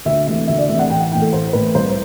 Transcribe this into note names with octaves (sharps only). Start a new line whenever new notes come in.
D2 E5
C3 E3 A3 E5
D2 E5
D5
C3 E3 A3 E5
F#5
A1 G5
F#5
A2 E3 G5
A4
A1 C5
A2 E3 B4
C2 C5